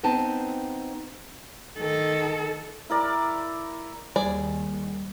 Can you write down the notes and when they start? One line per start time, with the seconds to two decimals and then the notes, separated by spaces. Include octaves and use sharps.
0.03 B3 C4 D#4 C5 G5 A5
1.77 D#3 A4
2.89 E4 A#4 D5
4.16 D#2 D#3 G3 G#4 D5